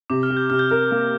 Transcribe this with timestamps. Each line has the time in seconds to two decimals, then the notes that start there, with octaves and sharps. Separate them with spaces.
0.10 C3 D6
0.23 F6
0.30 G4
0.37 G6
0.50 C3 F6
0.59 G6
0.70 A#4 F6
0.91 A#3